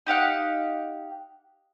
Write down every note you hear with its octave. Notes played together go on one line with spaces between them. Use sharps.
D#4 G4 F5 F#5